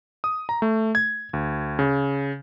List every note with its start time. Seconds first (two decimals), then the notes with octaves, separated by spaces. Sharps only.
0.24 D#6
0.49 A#5
0.62 A3
0.95 G#6
1.33 D2
1.79 C#3